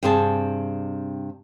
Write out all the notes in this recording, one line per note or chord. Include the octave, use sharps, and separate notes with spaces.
G2 C3 C4 G#4 G#5 A5